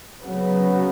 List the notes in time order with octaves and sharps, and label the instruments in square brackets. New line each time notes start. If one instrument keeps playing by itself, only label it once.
[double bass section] C#3 F#3 B3